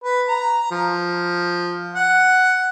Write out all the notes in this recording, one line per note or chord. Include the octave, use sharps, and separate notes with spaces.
B4
A#5
F3
F#5